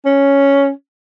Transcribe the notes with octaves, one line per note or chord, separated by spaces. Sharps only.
C#4